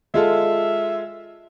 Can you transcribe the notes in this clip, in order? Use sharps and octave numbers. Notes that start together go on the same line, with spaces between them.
G#3 F4 A4 E5